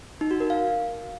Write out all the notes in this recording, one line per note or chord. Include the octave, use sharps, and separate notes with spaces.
D#4
F#4
A#4
F5